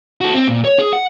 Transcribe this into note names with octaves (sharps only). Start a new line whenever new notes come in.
F#4 A4
C4
A#2
C#5
G#4
F#5